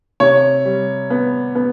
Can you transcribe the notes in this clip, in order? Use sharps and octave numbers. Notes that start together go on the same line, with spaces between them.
C3 C#5
G3
B3
B3